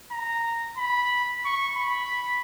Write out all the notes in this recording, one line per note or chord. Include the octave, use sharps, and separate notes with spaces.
A#5
B5
C#6
B5